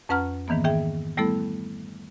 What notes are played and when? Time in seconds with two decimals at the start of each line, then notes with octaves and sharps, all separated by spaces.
0.09 F2 C#4 B4 F#5 A#5 F6
0.48 G#2 D#3 E3 A#3 B3
0.65 D#3 G#4 E5 G5
1.17 G3 A3 B3 E4 A4